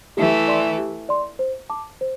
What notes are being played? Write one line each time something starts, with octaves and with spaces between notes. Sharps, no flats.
E3 A3 G4
D5 C6
G4
D5 C6
C5
A5 D6
C5